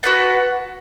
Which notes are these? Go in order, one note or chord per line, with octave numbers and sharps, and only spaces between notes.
F#4 B4 F#5 A5